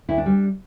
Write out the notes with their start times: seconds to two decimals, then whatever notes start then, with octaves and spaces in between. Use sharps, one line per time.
0.09 D2 E4
0.18 D4
0.26 G3